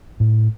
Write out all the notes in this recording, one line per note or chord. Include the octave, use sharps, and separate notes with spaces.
A2